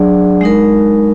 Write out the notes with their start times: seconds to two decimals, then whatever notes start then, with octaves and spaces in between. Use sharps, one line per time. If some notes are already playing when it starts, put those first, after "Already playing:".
Already playing: F#3 D4 G#4 D5 F#5
0.41 G#3 D#4 A#4